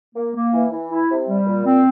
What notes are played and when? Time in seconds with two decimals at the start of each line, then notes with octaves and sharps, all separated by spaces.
0.15 A#3
0.35 A#3
0.53 E3
0.71 E3
0.90 E4
1.10 C3
1.28 G3
1.46 A#2
1.66 C4